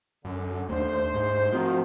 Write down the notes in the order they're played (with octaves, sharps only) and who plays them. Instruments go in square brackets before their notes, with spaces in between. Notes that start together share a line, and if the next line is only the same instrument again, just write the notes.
[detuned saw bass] F#2 [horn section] D3
[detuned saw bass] D#2 [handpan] A3 D4 [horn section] C5
[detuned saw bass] G#2
[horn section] D#3 [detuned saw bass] F3 [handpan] A3 C4 F#4